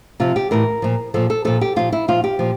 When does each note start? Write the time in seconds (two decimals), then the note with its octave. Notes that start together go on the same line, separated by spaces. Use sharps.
0.20 C3 F3 F4
0.36 G4
0.51 A2 E3 A#4
0.82 A#2 F3
1.14 A#2 F3 A4
1.30 A4
1.45 A#2 F3 A4
1.61 G4
1.76 A#2 F3 F4
1.92 E4
2.08 A#2 F3 F4
2.24 G4
2.39 A#2 F3